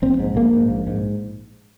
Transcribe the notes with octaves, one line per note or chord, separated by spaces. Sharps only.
A#1 C4
G#2
A#1 A#3
G#2
A#1
G#2